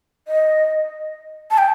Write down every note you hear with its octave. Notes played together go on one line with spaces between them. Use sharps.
D#5
A5
G5